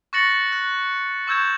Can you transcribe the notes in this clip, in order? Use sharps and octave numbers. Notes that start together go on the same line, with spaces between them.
C#6 F#6 A6 A#6 C#7 F#7
F#6
C#6 E6 G6 G#6 E7